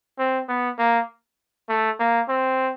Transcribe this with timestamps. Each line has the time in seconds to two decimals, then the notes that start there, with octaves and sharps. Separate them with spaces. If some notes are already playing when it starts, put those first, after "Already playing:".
0.19 C4
0.49 B3
0.79 A#3
1.69 A3
2.00 A#3
2.29 C4